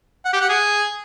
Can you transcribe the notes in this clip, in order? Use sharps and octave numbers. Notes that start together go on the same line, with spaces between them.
F#5
G4
F#5
G#4